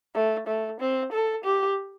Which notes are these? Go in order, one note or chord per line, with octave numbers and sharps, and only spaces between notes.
A3
A3
C4
A4
G4